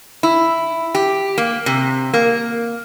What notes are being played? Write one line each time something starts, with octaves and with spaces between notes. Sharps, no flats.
E4
G4
A#3
C3
A#3